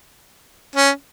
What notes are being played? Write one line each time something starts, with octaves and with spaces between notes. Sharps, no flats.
C#4